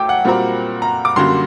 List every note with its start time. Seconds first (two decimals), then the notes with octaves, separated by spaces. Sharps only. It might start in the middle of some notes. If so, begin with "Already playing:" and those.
Already playing: F#3 A3 G5 D6
0.09 F#5
0.24 A#2 G3 C4 F#4 A#4
0.82 A#5
1.05 D6
1.16 F#2 D3 G3 A#3 F#4 C6